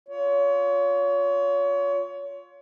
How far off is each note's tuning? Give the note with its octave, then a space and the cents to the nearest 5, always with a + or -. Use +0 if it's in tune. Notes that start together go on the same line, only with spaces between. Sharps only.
F4 +20 C#5 +30